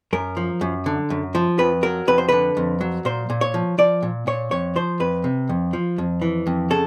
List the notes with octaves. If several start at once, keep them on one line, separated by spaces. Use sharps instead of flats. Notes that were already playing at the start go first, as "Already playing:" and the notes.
F#2 A#4
F3
F#2
D3
F#2
F3
F2 B4
F#3 A#4
F2 B4
C5
D3 B4
F2
F#3
A#2 C5
A#2
C#5
F3
F3 D5
A#2
A#2 C#5
F2 C#5
F3 C5
F2 B4
C3
F2
F3
F2
E3
F2
C#3 A4